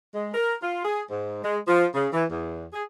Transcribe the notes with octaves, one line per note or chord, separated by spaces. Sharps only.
G#3
A#4
F4
G#4
G#2
G#3
F3
C#3
E3
E2
G#4